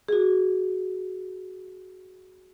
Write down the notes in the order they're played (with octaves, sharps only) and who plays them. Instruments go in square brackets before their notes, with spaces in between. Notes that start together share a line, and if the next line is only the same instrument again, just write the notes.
[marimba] F#4 G#4